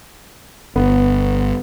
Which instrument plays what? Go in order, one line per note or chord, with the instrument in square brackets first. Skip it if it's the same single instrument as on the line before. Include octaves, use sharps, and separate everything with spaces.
[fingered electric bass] G1 [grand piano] B3